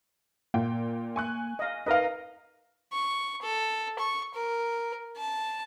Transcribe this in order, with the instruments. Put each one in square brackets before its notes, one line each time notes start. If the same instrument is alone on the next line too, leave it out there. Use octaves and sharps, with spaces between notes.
[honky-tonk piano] A#2 G5 [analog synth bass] A#3
[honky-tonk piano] G#5 C#6 F#6
[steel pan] D#5 F5
[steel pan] D#4 A#4 D#5 [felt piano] B4 F5
[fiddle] C#6
A4
C#6
A#4
A5